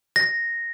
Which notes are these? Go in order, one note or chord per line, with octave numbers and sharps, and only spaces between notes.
A#6